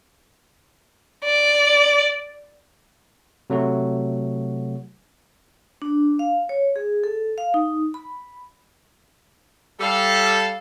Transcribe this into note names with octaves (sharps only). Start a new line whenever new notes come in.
D5
C3 F#3 A3 F#4
D4
F5
C#5
G#4
A4
F5
D#4
B5
G3 A4 F5